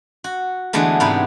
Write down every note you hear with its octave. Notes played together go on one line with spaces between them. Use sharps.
F#4
D3 E3 G#3 A3 B3
G#2 C3 B3 B4